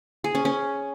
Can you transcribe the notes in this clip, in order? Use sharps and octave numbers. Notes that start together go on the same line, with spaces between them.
G#4
C#4
C#4